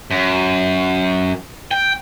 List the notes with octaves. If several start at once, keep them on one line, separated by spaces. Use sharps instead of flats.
F#2
G5